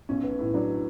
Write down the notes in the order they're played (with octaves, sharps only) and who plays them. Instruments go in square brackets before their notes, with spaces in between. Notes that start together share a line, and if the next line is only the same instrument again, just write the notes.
[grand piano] B1 [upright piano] C#4
[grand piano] B3
A2
[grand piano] F#3 [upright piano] D4